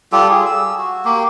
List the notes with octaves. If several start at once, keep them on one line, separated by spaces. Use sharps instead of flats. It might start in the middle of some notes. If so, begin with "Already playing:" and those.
G3 F4 G4 A4
G#4
E6
F#4
A#3 G4